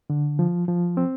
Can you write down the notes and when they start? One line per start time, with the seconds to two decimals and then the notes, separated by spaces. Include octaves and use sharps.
0.10 D3
0.39 F3
0.68 F3
0.97 C4